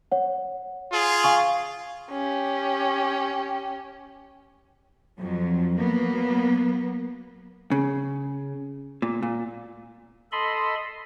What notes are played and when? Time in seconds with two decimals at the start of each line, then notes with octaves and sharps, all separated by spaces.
0.12 C#5 F#5
0.93 F4 G#4
1.24 F5 G#5 C#6
2.11 C#4 G4
5.19 F2 F#3
5.79 F#3 A#3 B3
7.71 C#3
9.02 A#2
9.23 A#2
10.32 A4 D#5 B5 C6